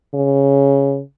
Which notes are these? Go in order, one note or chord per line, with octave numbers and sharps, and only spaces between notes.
C#3